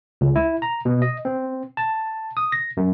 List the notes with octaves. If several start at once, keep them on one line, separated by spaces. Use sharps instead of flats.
C#2
E4
A#5
B2
D#5
C4
A5
D#6
A#6
F#2